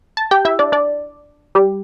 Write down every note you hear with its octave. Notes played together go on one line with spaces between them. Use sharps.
A5
G4 G5
E4 E5
D4 D5
D4 D5
G3 G4